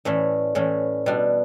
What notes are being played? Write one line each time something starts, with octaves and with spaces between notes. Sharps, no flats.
A2 E3 A3 C#4 D5
A2 E3 A3 C#4
B2 G3 D4